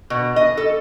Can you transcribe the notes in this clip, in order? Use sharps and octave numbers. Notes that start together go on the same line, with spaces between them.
B2
D#5
A4